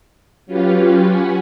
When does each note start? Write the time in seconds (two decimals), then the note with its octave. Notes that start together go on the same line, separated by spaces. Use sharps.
0.46 F#3 C#4 F4 G4 B4 F5
1.05 C#4 F#5 G#5 B6